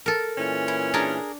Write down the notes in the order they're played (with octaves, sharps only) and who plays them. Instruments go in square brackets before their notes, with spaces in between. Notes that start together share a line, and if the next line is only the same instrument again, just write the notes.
[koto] A4 A#4
[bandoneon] A#2 E3 [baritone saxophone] C#4
[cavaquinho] E4
[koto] D4 [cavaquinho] G#4 A#4